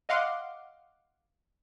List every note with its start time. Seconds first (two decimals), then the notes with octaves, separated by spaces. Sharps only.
0.09 D#5 F5 F#5 C6 D6